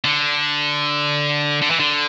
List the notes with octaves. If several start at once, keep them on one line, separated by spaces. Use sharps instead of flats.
D3
D3
E3
D3